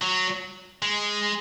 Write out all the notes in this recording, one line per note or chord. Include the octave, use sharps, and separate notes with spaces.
F#3
G#3